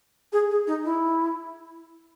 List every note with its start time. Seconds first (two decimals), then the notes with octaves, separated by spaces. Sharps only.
0.32 G#4
0.50 G#4
0.67 D#4
0.84 E4